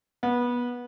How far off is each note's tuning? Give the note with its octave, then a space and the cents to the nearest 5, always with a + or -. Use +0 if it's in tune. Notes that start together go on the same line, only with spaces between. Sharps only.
B3 -20